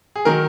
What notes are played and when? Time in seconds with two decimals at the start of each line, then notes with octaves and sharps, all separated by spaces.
0.16 G#4
0.25 D#3 F#3 A#4